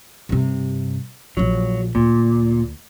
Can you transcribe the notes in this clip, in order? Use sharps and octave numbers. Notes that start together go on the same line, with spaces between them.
G2 C3
A#1 F3 F#3
D2 A#2